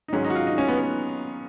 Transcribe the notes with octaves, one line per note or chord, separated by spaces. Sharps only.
D#4
G#2 D#3 F#3 C#4
D#4
F#4
F4
D#4
C#4
B3
B3